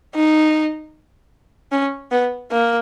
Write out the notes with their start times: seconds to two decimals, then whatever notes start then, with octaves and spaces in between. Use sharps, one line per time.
0.15 D#4
1.72 C#4
2.11 B3
2.51 A#3